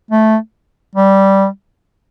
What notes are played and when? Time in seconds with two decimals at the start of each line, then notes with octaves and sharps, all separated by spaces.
0.11 A3
0.96 G3